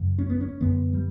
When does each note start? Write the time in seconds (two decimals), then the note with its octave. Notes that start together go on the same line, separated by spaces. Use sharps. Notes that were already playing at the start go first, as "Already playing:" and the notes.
Already playing: F#2 C#3
0.18 C#4
0.29 B3
0.41 C#4
0.60 F#2 D3 B3
0.93 G3